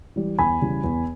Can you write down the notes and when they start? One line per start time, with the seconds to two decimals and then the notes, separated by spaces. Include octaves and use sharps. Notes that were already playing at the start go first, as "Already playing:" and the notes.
0.16 E3 G3
0.39 E2 G#5 B5
0.61 C#3 E3 G3
0.84 E2